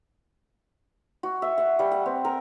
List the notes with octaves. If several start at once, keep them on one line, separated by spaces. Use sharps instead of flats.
F#4
E5
F#5
G3
F#5
C4
A#4